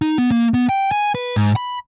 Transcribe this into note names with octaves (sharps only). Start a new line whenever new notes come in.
D#4
B3
A#3
B3
G5
G#5
B4
G#2
B5